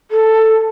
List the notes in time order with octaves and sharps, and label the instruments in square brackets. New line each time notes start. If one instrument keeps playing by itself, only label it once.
[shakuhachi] A4